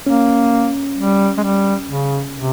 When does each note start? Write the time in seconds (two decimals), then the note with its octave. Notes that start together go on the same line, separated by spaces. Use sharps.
0.07 A#3 C#4
0.98 G3
1.37 G#3
1.43 G3
1.88 C#3
2.35 C3